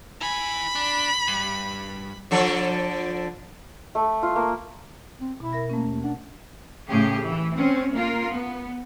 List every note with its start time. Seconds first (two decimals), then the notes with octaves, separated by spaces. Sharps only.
0.21 E4 G#5 B5
0.75 D4
1.27 G2
2.31 D3 F3 A4
3.95 A3
4.23 F4
4.36 A#3
5.21 C4
5.40 B2 E4
5.53 A#4 E5 A#6
5.70 A3 A#3 C#4
5.87 D#2
6.04 D4 F#5
6.89 A2 C#3 G4 G#4
7.26 E3
7.58 C4 C#4
7.94 A#3 F4 A#4
8.31 B3